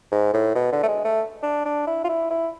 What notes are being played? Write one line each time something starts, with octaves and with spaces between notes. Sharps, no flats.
G#2
A2
B2
D3
A3
G#3
A3
D4
D4
E4
F4
E4
E4